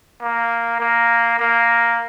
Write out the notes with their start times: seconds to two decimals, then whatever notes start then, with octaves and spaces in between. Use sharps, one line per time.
0.21 A#3
0.80 A#3
1.39 A#3